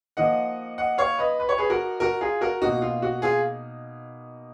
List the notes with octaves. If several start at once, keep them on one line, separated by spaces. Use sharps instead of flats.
F3 A#3 D#4 D#5 F#5
D#5 F#5
C#5 F5
B4 D#5
B4
C#5
G#4 B4
F#4 A#4
F#4 A#4
F4 G#4
F#4 A#4
B2 A#3 D#4 F#4
F4
F#4
F4 G#4